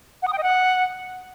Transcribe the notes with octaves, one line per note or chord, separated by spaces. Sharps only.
F#5
D#6
G5
D#5
F#5